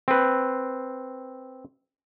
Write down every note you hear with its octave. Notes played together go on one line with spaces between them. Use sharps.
C4 B4